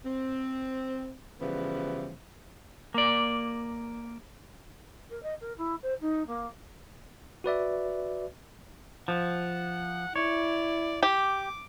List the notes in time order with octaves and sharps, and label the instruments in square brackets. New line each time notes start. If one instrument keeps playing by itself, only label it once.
[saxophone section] C4
C#3 E3 F3 G3 B3
[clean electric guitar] A#3 D5
[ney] A#4
D#5
A#4
E4
C5
D#4
A#3
[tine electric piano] F#4 B4 D5 E5
[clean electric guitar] F3 [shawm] F#5
[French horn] E4 [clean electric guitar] C#5 [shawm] D5
[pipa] G4 [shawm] D6